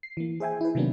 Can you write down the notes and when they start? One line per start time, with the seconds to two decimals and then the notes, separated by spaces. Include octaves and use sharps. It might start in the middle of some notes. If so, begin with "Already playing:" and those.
0.03 C7
0.17 E3 A#3
0.40 G#4 C5 E5 G5 G#5
0.61 E4 B4
0.75 C3 D#3 F#3 A#3 B3 D4